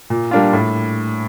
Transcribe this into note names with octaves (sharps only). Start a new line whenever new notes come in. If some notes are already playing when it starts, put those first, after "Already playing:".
A#2
G3 A#3 D4 F4
A2